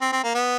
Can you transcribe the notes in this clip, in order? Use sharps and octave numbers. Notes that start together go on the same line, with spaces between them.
C4
C4
A#3
B3